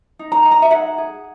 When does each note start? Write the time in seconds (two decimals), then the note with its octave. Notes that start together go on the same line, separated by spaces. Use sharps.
0.19 D#4
0.32 A#5
0.45 D#4
0.51 A#5
0.62 E5
0.71 G#4 F#5
0.98 G#4